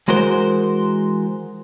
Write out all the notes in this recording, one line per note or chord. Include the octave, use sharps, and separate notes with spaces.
E3 G#3 F#4 A#4 C5